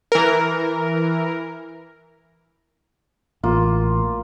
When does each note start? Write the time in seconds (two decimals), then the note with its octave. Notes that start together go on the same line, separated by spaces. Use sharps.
0.12 E3 A#4
3.43 A1 A#3 F4